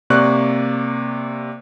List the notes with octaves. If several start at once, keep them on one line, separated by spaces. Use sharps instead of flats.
C3 A#3 D5 C#6 F#6